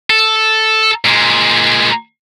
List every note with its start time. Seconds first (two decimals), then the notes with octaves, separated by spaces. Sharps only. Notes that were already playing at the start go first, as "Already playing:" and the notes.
0.10 A4
1.06 A#2 G#3